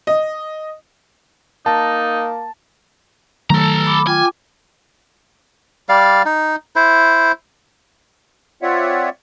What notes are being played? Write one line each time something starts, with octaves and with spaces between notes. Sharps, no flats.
D#5
A#3 D#4 A5
D#3 F#3 A3 A4 A#5
B5 D6
F4 G5 G#5 D6
G3 D5 F5
D#4
E4 C5
C4 F4 C#5 D5 E5 F#5